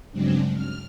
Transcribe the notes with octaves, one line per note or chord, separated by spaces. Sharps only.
G2 C#3 F#3 G#3 C4 D4
F6